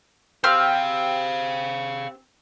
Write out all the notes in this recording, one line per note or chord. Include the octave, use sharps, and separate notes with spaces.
C4 G4 G#4 F5 F6